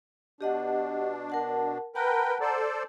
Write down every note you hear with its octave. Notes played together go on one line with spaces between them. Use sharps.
B2 D4 G4 D#5 F#5
A#4 F#5 A5
A#4 B4 F#5 G5 A5 A#5
A4 C5 D5